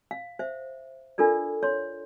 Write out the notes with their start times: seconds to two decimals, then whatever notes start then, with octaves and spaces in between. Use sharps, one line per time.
0.11 F5
0.39 C5 E5
1.18 D4 F4 A4 A#4 D5
1.63 C#5 C6